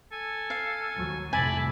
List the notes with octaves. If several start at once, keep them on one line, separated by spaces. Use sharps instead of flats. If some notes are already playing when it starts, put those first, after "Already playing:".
A4 G#5
F5
D#2 F#3
C2 F2 A2 D5 E5 G#5 A5 B5